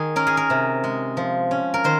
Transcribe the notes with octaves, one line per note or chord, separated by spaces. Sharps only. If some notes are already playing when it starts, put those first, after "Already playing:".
Already playing: D#3 G#4
C#4 A#4
G#4
A#4
C3
G#3
F3
C#4
A#4
D#3 C5